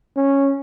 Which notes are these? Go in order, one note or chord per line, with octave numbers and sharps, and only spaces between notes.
C#4